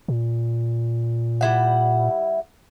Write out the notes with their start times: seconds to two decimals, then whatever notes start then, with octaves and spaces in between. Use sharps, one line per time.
0.08 A#2
1.41 G3 E4 F#5